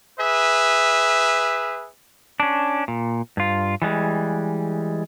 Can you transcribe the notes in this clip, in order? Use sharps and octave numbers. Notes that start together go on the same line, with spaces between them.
G#4 B4 E5
C#4 D4
A#2
G2 F4
E3 G3 G#3